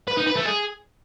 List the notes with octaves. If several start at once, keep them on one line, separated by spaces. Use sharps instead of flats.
B4
D#4
B4
A3
G#4